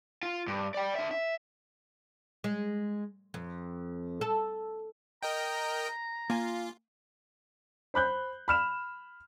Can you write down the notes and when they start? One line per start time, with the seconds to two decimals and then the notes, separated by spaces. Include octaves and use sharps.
0.23 F4
0.47 G2
0.74 D5 G5
0.95 D4 E5
1.11 E5
2.44 G#3
3.34 F2
4.21 A4
5.23 A#4 D#5 G5 A#5
6.30 A#3 F4 G#5
7.94 C5 B5 F#6 G6
8.48 B5 F6 E7